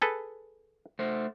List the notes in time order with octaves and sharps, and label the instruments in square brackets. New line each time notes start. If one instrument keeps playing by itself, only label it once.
[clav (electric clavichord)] G#4 A4 B4
[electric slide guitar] A3 C5